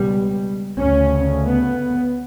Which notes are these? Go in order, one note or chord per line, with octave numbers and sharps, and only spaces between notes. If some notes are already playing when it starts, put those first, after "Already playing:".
Already playing: C#2 B2 G3
D2 C#3 C#4
B3